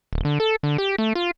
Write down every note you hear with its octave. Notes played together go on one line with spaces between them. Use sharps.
D1
D3
A4
D3
G4
A3
F4